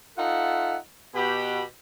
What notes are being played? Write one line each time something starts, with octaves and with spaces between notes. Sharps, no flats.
D#4 F4 A4 E5 F#5
B2 G4 B5